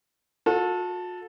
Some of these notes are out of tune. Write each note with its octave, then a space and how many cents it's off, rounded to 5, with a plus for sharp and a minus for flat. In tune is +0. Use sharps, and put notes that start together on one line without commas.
F#4 -45 A4 +0